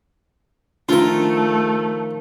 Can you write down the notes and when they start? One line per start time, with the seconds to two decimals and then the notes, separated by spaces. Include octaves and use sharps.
0.89 D#3 F3 A3 D4 F4 A#4